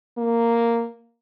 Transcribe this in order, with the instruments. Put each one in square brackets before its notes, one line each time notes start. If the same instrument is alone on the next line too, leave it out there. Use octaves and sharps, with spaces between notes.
[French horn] A#3